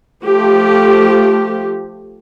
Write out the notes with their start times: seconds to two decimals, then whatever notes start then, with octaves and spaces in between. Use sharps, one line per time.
0.25 F3 A3 G4